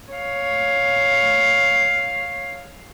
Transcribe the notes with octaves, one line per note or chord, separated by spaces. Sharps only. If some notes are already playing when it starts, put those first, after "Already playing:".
C#5 F5